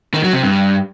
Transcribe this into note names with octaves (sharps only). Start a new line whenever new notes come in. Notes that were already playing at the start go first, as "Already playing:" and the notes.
D#3
F#3
C3
G2